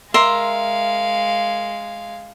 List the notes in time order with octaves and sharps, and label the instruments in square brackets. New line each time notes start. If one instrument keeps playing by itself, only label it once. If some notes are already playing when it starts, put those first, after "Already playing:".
[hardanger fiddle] G#3 F5 [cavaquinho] A#4 E5 C6